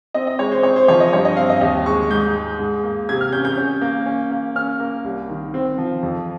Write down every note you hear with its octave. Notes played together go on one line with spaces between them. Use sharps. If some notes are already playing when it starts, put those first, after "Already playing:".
C4 D#5
D#5
G#3 C#5
C5
C4 C#5
C5
F3 C#5
D#5
G2 C#5
D#5
C4 F5
D#5
D#2 D#5
G#3 C#6
G#2 G6
G#3
G#2
A#3
C3 G#6
F6
C#4 G6
G6
C#4
A#3
C#4
A#3
C#4 F6
A#3
C2
D#3
C4
F3
F2